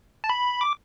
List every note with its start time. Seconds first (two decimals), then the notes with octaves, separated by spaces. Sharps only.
0.24 A5
0.29 B5
0.61 D6